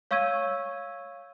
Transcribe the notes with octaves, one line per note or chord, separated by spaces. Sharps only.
C#5 F5 C#6 E6 G#6 D#7